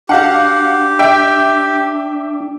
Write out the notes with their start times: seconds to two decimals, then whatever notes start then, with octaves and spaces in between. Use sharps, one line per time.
0.09 D4 F#4 G4 F5 F#5
0.99 E5 G5